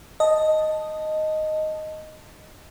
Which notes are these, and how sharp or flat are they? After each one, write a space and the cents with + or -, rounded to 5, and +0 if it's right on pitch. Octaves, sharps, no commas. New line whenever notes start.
D#5 +0 A5 +0